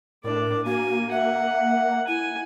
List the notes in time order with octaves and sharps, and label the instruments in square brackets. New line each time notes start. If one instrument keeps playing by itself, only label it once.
[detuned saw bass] A2 [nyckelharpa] D4 D5 [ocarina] A#4
[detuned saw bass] A#3 [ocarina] F#4 [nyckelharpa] G#5
[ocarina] E5 [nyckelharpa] F#5
[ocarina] E4 [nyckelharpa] G#5